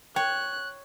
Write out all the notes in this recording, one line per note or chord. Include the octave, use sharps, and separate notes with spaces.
C#5 G5 F#6